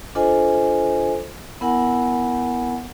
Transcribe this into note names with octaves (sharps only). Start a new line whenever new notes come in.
D4 F4 A4 C5 D#5 G#5
B3 E4 A#4 F#5 G#5